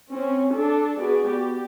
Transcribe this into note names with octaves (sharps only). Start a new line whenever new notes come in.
C4 C#4
D4 A4
B3 F#4 G#4 D5
G4